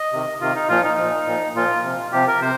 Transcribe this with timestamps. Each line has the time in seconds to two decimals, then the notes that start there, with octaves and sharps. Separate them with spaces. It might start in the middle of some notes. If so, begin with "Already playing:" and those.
Already playing: D#5
0.12 C3 D#3
0.41 C3 D#3 F4
0.55 D#4
0.69 A#2 F3 F4
0.84 D#4
0.98 A#2 F3
1.27 A#2 F3
1.55 A#2 F3 F4
1.83 C3 F3
2.12 C3 F3 G4
2.27 A#4
2.41 C3 C5